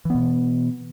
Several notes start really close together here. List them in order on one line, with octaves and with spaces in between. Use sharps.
E3 B3 B2